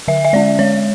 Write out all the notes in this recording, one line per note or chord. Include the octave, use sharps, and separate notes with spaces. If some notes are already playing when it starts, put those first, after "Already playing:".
D3 E5
E5
G#3 C#4 D5
G#3 C#5